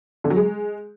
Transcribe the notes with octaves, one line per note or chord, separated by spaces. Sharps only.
D3
F#3
G#3